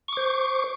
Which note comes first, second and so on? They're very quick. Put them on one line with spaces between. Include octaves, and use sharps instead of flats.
C#6 D6 C5